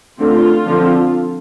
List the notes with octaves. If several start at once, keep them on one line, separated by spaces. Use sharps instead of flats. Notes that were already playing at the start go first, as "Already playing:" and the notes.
D3 A3 C4 F4
D3 F3 C4